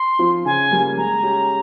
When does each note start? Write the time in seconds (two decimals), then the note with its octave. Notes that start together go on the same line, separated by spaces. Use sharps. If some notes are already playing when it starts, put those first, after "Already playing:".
Already playing: C6
0.19 F3 C4 F4
0.45 C#3 G#5
0.71 G3 A#3
0.97 G#3 A#5
1.23 C#4 G4